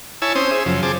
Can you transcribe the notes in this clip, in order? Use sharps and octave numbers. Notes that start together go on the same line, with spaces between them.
E4 C#5 G#5 A5 E6
C4 C#4 C5 D#6
G#4 E5
F#2 C#3 F3
C4 G#4 A5 D6